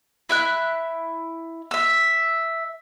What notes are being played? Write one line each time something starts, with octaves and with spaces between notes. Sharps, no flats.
E4 E5 F#6
E5 E6